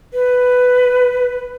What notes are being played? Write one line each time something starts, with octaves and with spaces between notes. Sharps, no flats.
B4